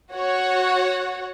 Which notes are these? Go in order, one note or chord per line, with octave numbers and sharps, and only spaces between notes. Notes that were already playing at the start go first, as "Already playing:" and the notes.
F#4 C#5 F#5